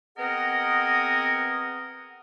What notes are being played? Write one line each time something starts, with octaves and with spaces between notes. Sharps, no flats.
B3 C4 G#4 A#4 D#5 F#5